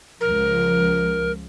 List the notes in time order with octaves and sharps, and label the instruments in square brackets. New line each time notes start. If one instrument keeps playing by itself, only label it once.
[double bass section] C#2 F3 [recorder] A#4